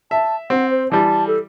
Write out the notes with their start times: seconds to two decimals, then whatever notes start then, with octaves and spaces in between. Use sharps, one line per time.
0.11 E5 A5
0.50 C4 F#5
0.71 C5
0.92 E3 G3 A5
1.27 A4